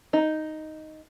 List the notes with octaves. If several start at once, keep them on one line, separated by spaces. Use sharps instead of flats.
D#4